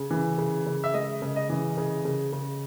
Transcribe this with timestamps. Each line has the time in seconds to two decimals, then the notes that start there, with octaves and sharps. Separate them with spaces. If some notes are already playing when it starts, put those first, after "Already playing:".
Already playing: C#3
0.11 E3
0.38 C#3
0.66 C#3
0.84 E5
0.94 G#3 D#5
1.22 C#3
1.36 D#5
1.50 E3
1.77 C#3
2.05 C#3
2.32 C#3